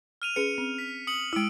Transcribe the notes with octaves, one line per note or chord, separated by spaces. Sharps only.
F6 D#7 F7
C#4 G#4 B4 C#7 D#7
C4
B6
D#6 C#7 F#7
G#3 E4 E6 D7